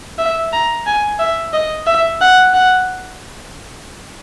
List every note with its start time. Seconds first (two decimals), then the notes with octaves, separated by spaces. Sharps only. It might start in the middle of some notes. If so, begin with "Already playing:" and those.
0.19 E5
0.52 A#5
0.87 G#5
1.19 E5
1.53 D#5
1.87 E5
2.21 F#5
2.54 F#5